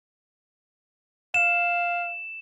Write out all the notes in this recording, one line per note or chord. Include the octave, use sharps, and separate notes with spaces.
F5 E7